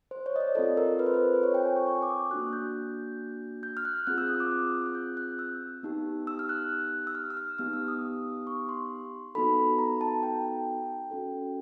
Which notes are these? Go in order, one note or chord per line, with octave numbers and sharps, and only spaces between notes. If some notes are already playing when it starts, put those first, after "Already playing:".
C5
C#5
D#5
D5
C4 F4 A4 D#5
A#4
B4
C5
B4
C5
C#5
G5
G#5
C#6
C#6
D6
D#6
A#3 D4 F#4 F#6
G6
G6
F6
F#6
C4 F4 G#4 F#6
E6
D#6
D6
F#6
F#6
G6
F#6
E6
B3 D#4 G4
E6
F6
F#6
E6
F6
E6
F6
B3 D#4 G4 F6
E6
D#6
C#6
C6
B3 D#4 F#4 A4 B5
A#5
A5
G5
G5
C#4 F#4 A4